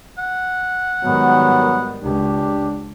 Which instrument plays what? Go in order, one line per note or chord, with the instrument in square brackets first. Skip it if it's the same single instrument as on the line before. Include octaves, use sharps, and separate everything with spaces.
[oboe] F#5
[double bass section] G#2 D#3 G3 [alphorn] F#3 [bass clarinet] B3
[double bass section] C#2 [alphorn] D4 [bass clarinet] G4